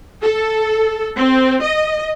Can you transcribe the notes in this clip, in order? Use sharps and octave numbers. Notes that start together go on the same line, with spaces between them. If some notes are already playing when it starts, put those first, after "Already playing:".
A4
C4
D#5